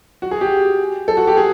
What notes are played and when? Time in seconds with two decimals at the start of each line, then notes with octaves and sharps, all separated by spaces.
0.22 F#4
0.31 G#4
0.41 G4
1.08 A4
1.17 F#4
1.27 G4
1.37 G#4